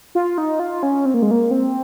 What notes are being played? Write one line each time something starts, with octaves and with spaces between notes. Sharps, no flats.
F4
D#4
F4
C#4
C4
A#3
G#3
A#3
C4